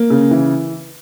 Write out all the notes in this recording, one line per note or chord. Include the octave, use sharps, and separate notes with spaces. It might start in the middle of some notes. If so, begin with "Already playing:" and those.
Already playing: A#3
C#3
E3